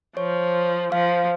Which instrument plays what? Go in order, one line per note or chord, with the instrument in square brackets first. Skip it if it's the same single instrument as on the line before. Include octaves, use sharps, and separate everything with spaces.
[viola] F3 [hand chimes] C#5
[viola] F3 [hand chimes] F5